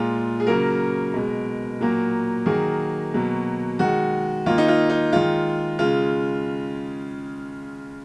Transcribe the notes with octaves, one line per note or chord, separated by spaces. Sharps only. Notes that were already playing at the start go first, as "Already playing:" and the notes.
Already playing: A#2 G#3 F4
G#4
C#3 F#3 A#3 A#4
B2 G#3
A#2 F#3 A#3
D#3 F#3 A#3 G#4
B2 F#3 A#3
D#3 G#3 F#4
D#3 A#3 F4
D#4
F4
D#4
D#3 G#3 F4
C#3 G#3 F4